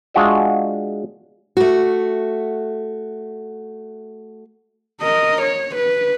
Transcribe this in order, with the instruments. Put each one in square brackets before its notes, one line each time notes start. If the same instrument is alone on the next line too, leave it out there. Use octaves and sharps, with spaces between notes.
[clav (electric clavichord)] G#3 D4 F4 F#4 D#5 E5
[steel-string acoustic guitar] A3 F#4
[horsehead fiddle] A#4 D#5
C#5
B4